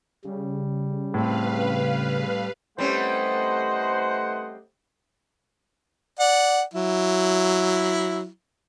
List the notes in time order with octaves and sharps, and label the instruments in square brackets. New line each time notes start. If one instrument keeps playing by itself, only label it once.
[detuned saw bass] C#3 [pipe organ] G3
[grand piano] A2 C4 [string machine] B4 F5
[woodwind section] E3 C5 [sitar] G3 C4 C#4 [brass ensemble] A3 D#5 F#5
[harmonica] D5 F#5
F#3 E4